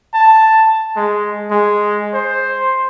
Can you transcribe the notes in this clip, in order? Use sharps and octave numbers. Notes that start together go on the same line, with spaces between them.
A5
G#3
G#3
C5